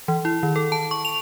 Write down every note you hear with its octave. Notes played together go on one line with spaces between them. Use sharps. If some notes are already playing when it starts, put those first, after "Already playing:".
E3
E4
D#3
A4
A5
C#6
F7